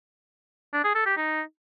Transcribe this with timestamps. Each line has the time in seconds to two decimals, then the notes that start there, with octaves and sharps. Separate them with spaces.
0.73 D4
0.84 G#4
0.95 A4
1.06 G4
1.17 D#4